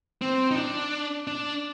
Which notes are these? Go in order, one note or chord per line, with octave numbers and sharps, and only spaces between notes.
C4
D#4
D4
D4